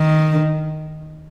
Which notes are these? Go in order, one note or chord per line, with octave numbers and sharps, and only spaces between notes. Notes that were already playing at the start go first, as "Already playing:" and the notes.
Already playing: D#3